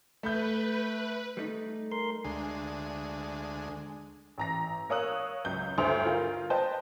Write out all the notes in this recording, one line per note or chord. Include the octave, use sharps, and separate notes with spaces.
A3 B4 B5 G6
G3 A3 D#4
A#4 C6
D2 G#3
A1 A#5 A#6
A#4 C#5 F5 D#6 E6 F#6
C#2 F#2 G6
G1 D2 G2 C5 C6 F7
F4 A#4
B4 C5 D#5 G5 A5 G6